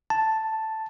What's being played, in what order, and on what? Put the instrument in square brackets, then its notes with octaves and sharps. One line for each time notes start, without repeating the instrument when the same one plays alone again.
[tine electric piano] A5